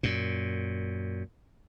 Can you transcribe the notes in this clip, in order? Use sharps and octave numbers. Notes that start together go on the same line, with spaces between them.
F#2 A#2